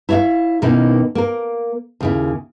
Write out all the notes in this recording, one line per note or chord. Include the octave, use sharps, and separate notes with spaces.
E4 C#5 D5 E5 F5
B2 D#3 A#3 C#4 D#4 E4
A#3 A#4
D#2 C#3 E4